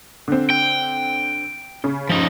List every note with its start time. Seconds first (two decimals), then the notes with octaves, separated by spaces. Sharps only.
0.28 D3 C4
0.50 G5
1.84 C#3
2.09 F3 D#4